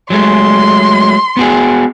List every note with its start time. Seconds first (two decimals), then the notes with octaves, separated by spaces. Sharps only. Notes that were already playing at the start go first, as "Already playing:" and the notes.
0.10 F#3 G#3 A3 C6
1.37 B3 F#4 G#4